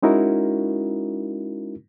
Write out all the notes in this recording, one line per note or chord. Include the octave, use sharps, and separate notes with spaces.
G#3 C#4 D#4 E4 F#4 A#4